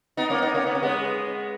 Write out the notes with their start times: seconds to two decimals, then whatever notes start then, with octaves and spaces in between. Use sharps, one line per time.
0.17 B3 D#4
0.30 A#3 C#4
0.42 B3 D#4
0.54 A#3 C#4
0.67 B3
0.75 C#4
0.82 G#3 B3